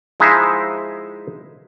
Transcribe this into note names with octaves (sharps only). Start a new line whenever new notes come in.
F3 G#3 D#4 E4 C5 E5